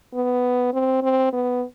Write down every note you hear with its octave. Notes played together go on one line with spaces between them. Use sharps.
B3
C4
C4
B3